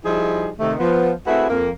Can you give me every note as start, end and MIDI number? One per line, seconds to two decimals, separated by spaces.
0.06 0.50 53
0.06 0.50 55
0.06 0.50 63
0.06 0.50 64
0.06 0.50 68
0.60 0.74 48
0.60 0.74 51
0.60 0.74 57
0.79 1.11 53
0.79 1.11 59
1.27 1.47 57
1.27 1.47 60
1.27 1.47 64
1.27 1.47 66
1.27 1.47 68
1.27 1.47 71
1.49 1.71 41
1.49 1.71 58